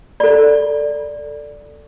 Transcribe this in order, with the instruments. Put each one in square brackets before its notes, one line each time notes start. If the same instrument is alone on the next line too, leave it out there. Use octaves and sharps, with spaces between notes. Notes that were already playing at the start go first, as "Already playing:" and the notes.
[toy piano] A4 D5